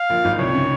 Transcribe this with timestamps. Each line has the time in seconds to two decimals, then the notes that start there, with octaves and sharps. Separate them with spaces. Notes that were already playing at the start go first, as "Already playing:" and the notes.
Already playing: F5
0.10 A#1 A#2
0.24 G#1 G#2
0.39 C2 C3 C#5
0.54 C#3